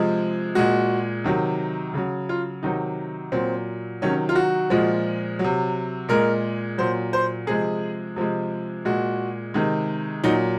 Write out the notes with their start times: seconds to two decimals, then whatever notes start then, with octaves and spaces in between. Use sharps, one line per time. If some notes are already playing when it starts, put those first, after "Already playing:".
Already playing: C3 F3 G#3
0.55 A#2 G#3 F#4
1.24 C3 D#3 F#3
1.94 C#3 F#3
2.29 F4
2.63 C3 D#3 F#3 D#4
3.32 A#2 F#3 C4
4.02 C3 D#3 F#3 C#4
4.29 F4
4.35 F#4
4.70 A#2 F3 G#3
5.39 F#3
5.44 C3
6.09 A#2 G#3 A#4
6.78 A#2 F#3 C5
7.13 C5
7.47 C3 F3 G#3 G#4
8.16 C3 F3 G#3
8.85 A#2 G#3 F#4
9.54 C3 D#3 G#3
10.24 A#2 F#3 D#4